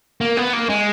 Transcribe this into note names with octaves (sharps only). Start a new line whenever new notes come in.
A#3
B3
A#3
G#3